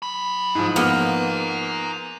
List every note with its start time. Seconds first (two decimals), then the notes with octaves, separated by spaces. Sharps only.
0.02 F#3 B5
0.55 G#2 F3
0.76 A#3 B3 F5 A#5